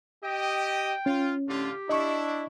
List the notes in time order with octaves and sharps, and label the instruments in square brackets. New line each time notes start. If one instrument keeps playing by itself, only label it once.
[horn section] G4 D#5 [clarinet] G5
[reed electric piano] C#4 [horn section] F4
[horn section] A2 D3 F4 [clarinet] G4
[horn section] D4 E4 [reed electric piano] D#5 C#6